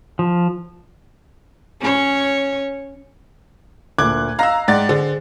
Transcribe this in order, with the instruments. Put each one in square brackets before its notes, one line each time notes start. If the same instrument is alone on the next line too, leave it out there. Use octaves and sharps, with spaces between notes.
[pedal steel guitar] F3
[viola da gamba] C#4 C#5
[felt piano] D2 A#2 [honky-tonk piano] D6 F#6 G#6
[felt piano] D#5 E6 [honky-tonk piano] F5 A#5 A#6
[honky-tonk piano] G#2 D5 A6 [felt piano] F#5 G5
[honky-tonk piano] D3 [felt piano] G#4 C5